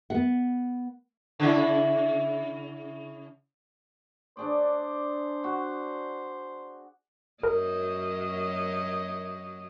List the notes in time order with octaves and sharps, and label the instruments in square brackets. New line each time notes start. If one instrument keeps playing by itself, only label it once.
[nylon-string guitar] B3 F#5
[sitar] C#3 E4
[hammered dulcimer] D4 G#4 D5 [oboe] C5
[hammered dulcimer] F#4
[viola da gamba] F#2 F#3 D#5 [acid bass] A#4